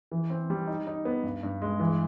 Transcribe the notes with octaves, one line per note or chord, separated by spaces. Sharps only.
E3
C4
G3
D#4
D#4
B3
G2
G2
G#3
E3